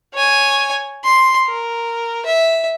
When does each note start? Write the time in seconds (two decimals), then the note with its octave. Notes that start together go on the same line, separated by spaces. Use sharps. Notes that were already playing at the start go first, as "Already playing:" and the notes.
0.14 C#5 G#5
1.04 C6
1.46 A#4
2.25 E5